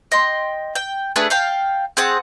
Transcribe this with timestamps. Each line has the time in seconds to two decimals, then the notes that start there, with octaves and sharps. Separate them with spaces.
0.12 D#5 G5 C6
0.75 G5
1.16 A3 D4 G#4 B4
1.30 F5 G5 A5
1.97 C4 G#4 F#5 A5